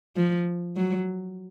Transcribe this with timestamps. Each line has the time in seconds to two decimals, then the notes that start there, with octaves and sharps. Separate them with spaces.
0.16 F3
0.77 F#3